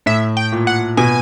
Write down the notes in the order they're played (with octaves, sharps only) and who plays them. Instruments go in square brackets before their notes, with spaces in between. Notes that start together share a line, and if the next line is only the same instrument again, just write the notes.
[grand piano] A2 [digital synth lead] E5
[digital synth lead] G5
[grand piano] A#2
[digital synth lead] F#5
[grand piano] B2 [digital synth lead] G#5